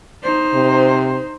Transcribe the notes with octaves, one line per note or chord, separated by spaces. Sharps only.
D#4 C5
C3